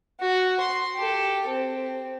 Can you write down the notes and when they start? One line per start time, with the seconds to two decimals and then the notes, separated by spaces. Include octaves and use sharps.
0.20 F#4
0.60 C6
0.96 G4 A4
1.47 C4